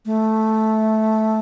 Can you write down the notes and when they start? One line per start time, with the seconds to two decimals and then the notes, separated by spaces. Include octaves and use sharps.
0.06 A3